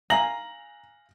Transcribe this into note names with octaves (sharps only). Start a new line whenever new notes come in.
F5 G#5 A#5 A#6 F#7